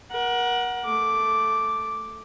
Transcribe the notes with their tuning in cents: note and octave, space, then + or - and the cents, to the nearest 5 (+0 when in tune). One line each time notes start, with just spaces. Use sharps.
A#4 +30 F#5 +0
A3 +0 D6 +0